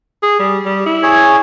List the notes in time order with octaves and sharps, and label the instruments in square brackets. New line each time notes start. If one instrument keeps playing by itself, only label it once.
[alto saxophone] G#4
G3
G3
E4
[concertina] G#4 C#5